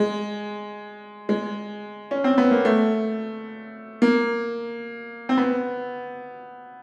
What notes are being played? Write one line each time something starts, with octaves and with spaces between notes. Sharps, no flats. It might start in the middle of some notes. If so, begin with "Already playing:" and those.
Already playing: G#3
G#3
C#4
C4
B3
A#3
A3
A#3
C4
B3